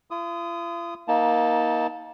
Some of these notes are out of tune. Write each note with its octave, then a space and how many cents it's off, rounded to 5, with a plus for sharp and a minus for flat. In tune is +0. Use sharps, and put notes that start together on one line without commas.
F4 -45 D#6 +0
A#3 +25 D#4 +35 A5 +0